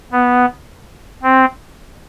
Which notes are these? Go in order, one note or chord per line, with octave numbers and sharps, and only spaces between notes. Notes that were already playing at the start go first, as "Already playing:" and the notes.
B3
C4